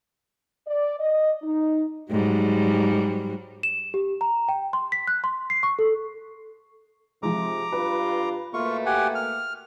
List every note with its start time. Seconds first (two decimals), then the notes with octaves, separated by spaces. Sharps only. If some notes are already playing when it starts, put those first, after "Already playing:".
0.67 D5
1.00 D#5
1.42 D#4
2.11 G#2 F#3 G3
3.63 E7
3.94 G4
4.21 A#5
4.49 G5
4.73 C6
4.92 B6
5.07 F#6
5.24 C6
5.50 C7
5.63 C#6
5.79 A4
7.23 C3 F3 G#3 A#5 D6
7.72 G2 F4 B4
8.54 B2 A3 A#3 F4 C#6
8.86 G4 F#5 G#5
9.15 F6